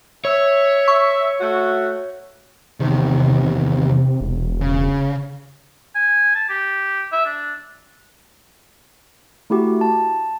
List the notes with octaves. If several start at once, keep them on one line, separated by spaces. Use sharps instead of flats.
C#5 E5
C#6
A3 F#4
E2 C3 D#3
E1
C#3
G#5
A5
G4
E5
D4
A3 E4 F#4 G4
A5